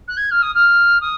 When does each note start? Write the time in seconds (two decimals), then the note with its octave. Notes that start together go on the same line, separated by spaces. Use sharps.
0.08 F#6
0.17 G#6
0.31 F6
0.42 D#6
0.55 F6
1.01 D#6